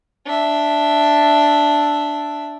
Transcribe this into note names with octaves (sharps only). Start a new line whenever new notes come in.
D4 E5